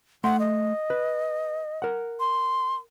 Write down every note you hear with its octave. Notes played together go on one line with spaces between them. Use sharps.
A3 F#5 C6
D#5
B4
A#4 F#5
C6